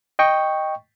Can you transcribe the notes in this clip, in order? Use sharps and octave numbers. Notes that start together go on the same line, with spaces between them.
D#5 G5 C#6